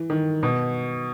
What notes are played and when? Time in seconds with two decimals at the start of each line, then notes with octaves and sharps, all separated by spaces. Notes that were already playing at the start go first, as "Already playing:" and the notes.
Already playing: E3
0.10 D#3
0.43 B2